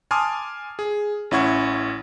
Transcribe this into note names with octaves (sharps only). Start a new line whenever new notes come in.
G#5 A5 C6 D6 D#6 F6
G#4
A1 C#4 E4 F#5 C#6 G#6